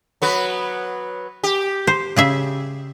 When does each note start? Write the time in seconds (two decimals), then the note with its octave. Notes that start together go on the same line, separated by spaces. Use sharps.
0.22 F#3 B3 B4
1.43 G4
1.87 C5
2.16 C#3 G#4 E5